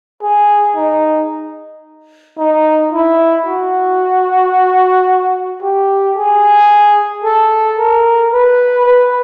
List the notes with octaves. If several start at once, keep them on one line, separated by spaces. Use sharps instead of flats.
G#4
D#4
D#4
E4
F#4
G4
G#4
A4
A#4
B4
B4